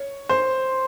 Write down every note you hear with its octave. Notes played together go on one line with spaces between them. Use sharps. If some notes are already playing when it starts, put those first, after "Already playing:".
Already playing: C#5
C5